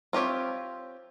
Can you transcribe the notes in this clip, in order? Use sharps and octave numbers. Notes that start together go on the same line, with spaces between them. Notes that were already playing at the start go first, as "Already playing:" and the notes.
C4 F4 G4 C#5 E5